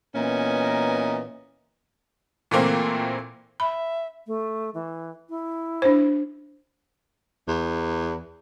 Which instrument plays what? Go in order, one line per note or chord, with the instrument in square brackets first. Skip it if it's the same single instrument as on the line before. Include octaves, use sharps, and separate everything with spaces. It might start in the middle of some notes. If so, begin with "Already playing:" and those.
[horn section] A#2 E3 B3 C#4 A#4 D#5
[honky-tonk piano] A#2 E3 A3 A#3 C4
[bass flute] E5 [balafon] B5
[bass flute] A3
E3
E4
[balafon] D4 C5
[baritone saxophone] E2